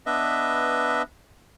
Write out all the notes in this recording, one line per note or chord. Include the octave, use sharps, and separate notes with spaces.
B3 D4 B4 D#5 E5